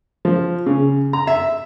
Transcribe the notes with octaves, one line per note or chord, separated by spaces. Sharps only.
F3
C#3
A#5
E5